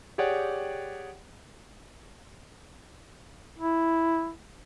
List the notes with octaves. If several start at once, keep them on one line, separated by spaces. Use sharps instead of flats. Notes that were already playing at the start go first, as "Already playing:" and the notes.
G4 G#4 C#5 D5 F#5 G5
E4